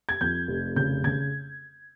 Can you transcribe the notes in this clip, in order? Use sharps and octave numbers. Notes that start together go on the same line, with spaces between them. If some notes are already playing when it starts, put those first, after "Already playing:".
G#6
F2 G6
F1
C#3 G6
C#3 G#6